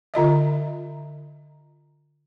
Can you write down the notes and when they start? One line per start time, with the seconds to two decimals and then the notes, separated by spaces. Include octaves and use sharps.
0.14 D3 F4 D#5 E5